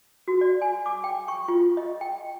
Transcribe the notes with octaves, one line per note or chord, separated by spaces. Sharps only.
F#4
D5
G#5
D6
G5
C#6
F4
D#5
G5